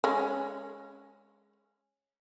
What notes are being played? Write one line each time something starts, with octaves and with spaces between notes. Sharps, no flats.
G#3 C#4